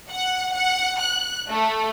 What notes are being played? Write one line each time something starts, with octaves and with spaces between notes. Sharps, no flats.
F#5
F#5
F#6
A3